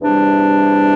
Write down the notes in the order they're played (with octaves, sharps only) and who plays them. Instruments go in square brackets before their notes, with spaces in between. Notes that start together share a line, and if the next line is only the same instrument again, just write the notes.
[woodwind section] E2 C3 G3 D4